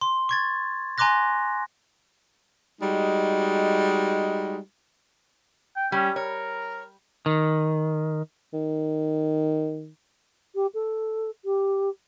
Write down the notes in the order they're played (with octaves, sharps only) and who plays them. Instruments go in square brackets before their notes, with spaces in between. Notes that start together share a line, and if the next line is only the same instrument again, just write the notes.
[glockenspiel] C6
C#6 G#6 A6
G#5 A#5 C6 D6 F#6 A#6
[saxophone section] G3 G#3 D#4 F#4
[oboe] G5
[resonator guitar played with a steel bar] G3 [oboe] C#4
[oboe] A#4 [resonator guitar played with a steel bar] C#5
[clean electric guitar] D#3
[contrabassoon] D#3
[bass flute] G4
A4
G4